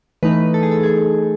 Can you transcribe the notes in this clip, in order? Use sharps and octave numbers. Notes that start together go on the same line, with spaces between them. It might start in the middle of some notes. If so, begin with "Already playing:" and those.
E3 A3 D#4 B4
A4
G#4
A4
G#4